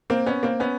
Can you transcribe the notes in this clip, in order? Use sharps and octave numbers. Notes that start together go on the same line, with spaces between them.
A#3 C4
B3 C#4
A#3 C4
B3 C#4